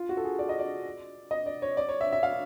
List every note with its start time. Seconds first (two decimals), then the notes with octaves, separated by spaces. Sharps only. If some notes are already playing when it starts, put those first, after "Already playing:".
Already playing: F4
0.09 F#4
0.17 A4
0.24 G#4
0.39 D5
0.49 D#5
0.59 D5
1.31 D#5
1.46 D5
1.62 C#5
1.77 D5
1.89 C#5
2.01 E5
2.12 E5
2.23 F5